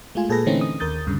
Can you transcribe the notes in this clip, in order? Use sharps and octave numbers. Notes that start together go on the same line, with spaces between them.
G#3 A3 F4 G#5
A#2 G#4 A4 B4 A#6
D3 E3 A3 C4 C#4 D#4
D#6
D#2 A#4 D#6 G6 A6
D2 G2 C#3